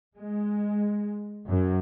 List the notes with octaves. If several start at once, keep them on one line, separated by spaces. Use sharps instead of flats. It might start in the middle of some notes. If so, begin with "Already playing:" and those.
G#3
F#2